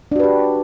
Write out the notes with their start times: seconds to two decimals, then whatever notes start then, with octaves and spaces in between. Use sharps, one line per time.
0.12 D4
0.16 F#4
0.20 B4
0.24 G4